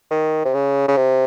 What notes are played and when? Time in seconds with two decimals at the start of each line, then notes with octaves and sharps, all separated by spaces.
0.11 D#3
0.45 C3
0.54 C#3
0.88 C#3
0.97 C3